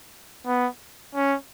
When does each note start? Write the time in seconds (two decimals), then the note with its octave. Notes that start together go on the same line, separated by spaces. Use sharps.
0.47 B3
1.15 C#4